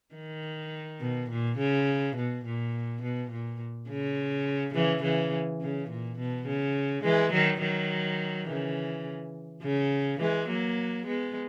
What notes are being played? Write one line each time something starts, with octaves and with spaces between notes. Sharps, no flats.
D#3
B2
A#2
C#3
B2
A#2
B2
A#2
C#3
C#3 E3
C#3 E3
C#3
A#2
B2
C#3
E3 G#3
D#3 F#3
D#3 F#3
C#3 E3
C#3
E3 G#3
F#3 A#3
G#3 B3